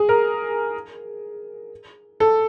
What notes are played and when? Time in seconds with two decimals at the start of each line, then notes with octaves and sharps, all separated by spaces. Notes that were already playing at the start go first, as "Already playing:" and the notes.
Already playing: G#4
0.09 A#4
2.20 A4